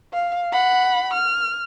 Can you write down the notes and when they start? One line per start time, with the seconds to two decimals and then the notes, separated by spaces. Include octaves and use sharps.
0.13 F5
0.53 F#5 B5
1.14 F6